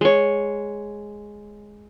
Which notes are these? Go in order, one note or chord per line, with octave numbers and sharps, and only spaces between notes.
G#3 C#5